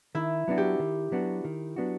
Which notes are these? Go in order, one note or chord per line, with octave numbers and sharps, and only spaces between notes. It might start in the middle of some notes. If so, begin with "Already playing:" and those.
D#3 E4
F#3 B3 D4 F#4
G4
D#3
F#3 B3 D4 F#4
D#3
F#3 B3 D4 F#4